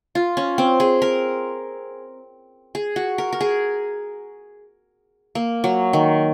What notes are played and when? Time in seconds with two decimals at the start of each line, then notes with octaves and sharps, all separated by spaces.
0.15 F4
0.37 C#4
0.58 C4
0.80 G#4
1.02 A#4
2.75 G#4
2.96 F#4
3.18 A#4
3.33 A#4
3.41 G#4
5.35 A#3
5.64 F#3
5.93 D#3